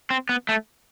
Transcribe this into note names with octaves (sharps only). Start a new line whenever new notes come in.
C4
B3
A3